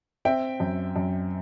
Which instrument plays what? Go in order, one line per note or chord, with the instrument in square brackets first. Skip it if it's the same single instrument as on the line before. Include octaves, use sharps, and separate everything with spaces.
[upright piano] C4 E5 G5
F#2
F#2